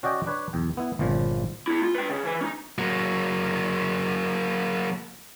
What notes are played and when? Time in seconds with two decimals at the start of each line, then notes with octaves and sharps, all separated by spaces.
0.03 C#4 F#4 D5 D#5 G5
0.26 D4 B4 C#5
0.53 B1 E2 G5
0.77 B3 E4
0.99 G1 A#2 C#3 F3
1.68 B3 E4
1.83 F4
1.95 B4 G5
2.10 C#3
2.25 E3 B4
2.41 C#4 D#4
2.78 F#3 A#3